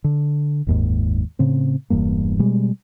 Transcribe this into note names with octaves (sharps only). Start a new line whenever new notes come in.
D3
F#1 D#2 G#2
A2 C#3 C4
E1 E2 G2 A#3
B2 G3 G#3